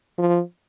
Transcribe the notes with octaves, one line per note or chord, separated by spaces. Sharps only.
F3